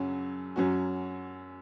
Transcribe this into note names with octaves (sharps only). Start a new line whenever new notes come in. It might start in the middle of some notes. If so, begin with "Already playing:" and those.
Already playing: F#2 C#3 F#3 C#4 F#4
F#2 F#3 C#4 F#4